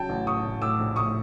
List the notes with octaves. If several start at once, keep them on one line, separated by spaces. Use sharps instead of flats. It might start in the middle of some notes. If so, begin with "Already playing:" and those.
Already playing: C#3 F#3 G5 A5
A1
A2 C#6 D#6
A1
A2 D6 E6
A#1
A2 C#6 D#6